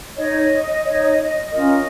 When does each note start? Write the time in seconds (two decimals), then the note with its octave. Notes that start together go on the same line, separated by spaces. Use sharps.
0.17 D#4 C#5 D#5
0.85 D#4 C#5
1.51 C#4 F4 A#4 D#5